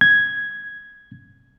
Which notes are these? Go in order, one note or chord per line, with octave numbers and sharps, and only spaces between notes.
G#6